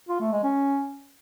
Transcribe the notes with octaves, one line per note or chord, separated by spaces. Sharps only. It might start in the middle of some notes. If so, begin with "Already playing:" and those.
F4
A3
G#3
C#4